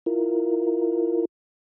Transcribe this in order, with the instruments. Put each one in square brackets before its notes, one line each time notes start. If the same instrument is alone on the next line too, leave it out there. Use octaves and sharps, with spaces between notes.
[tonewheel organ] E4 F4 A#4